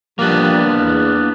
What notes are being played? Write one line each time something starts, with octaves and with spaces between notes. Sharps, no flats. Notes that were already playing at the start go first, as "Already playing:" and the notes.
F3 G3 A#3 B3 D4
E2